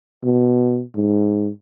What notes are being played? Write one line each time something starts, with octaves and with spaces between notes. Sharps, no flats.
B2
G#2